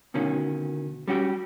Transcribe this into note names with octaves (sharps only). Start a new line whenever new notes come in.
D2 B2 D#3 C#4
G3 C#4 F#4 G4